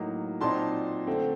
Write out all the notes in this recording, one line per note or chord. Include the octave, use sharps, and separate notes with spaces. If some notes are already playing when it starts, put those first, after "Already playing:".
Already playing: A2 F#3 A#3 D#4
A#2 F#3 C4 D#4 A5 C6
D3 A3 C4